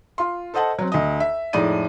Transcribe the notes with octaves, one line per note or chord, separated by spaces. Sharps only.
F4 C6
A4 C5 D#5 F#5 A5
F#3 C4
D2 D#5
E5
F2 A2 G#3 D#4 D5 D#7